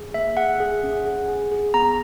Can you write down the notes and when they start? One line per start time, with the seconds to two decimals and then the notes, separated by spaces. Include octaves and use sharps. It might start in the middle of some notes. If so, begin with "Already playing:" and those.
Already playing: G#4
0.14 A#3 E5
0.37 G#4 F#5
0.60 G#4
0.83 C#4
1.05 G#4
1.28 G#4
1.52 G#4
1.74 B3 A#5